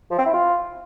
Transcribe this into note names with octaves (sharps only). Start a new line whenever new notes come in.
F3
C4
E4
F4